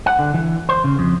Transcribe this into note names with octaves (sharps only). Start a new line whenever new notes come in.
F#5
D3
E3
C5
C#3
F2